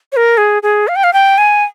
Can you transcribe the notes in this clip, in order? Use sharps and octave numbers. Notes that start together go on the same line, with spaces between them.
C#5
A#4
G#4
G#4
F5
G5
F5
G5
G#5